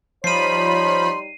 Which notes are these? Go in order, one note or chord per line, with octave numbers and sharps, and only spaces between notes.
F3 G3 D#4 C#5 B5 C6 C7 D#7